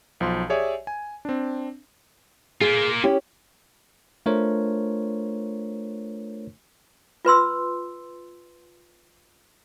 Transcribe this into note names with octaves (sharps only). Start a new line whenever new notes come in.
B1 F3 C6
G4 G#4 C#5 D5 E5 G#5
G#5
C4 D4
A#3 F4 G#4
C#4 E4 G4
A3 D4 F4 A#4 C5 C#5
F4 B4 C6 E6